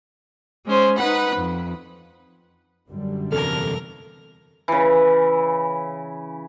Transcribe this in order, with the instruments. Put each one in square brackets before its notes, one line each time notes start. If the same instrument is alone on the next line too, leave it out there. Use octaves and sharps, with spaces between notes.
[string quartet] G#3 C#4 C5
D#4 B4 F#5 B5
F2
[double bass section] F#2 D3 G3
[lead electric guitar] E2 C3 [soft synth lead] A4 [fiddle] A#4 F6
[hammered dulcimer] C#3 E3